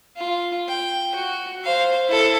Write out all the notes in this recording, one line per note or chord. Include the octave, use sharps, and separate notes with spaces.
F4
G5
F#4
C5 F5
E4 A4